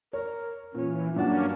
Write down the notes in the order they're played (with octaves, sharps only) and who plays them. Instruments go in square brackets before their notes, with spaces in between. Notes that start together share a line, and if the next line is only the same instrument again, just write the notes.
[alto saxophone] A#4 [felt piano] C#5
[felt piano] A#2 [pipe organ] E3 [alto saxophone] C#4
[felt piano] G2 F#3 F#5 [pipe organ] A#3 C#4 [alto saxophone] D4